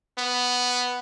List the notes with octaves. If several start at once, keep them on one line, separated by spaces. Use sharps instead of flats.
B3